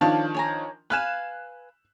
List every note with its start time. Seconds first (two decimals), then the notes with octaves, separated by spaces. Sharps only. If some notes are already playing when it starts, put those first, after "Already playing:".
0.01 D#3 F3 D4 C#5 F5 A5
0.34 C#5 G#5 A#5
0.90 B4 F5 G#5 F#6 E7